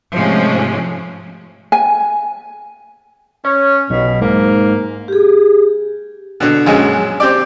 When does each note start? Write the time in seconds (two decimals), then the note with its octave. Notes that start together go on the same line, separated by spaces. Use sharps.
0.13 G#2 C3 F3 G#3 A3 C#4
1.72 G#5
3.45 C#4 C#5
3.90 B1 B2
4.21 G#2 A#3
5.08 G4 G#4
6.40 B2 D3
6.66 A#1 F#2 G#3
7.20 C4 G4 D5